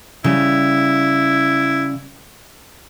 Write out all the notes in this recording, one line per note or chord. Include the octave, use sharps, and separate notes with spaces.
C#3 G3 E4